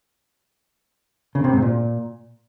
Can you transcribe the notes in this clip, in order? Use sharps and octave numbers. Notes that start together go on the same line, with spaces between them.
C#3
C3
G#2
A#2